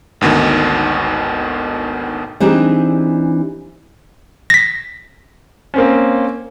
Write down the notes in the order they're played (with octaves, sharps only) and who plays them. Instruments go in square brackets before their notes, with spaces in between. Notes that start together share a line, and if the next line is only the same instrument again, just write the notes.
[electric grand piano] G#1 D2 B2 D#3
[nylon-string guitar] E3 C4 D4 D#4 G4 G#4
[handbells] A#6 B6
[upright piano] A#3 C4 C#4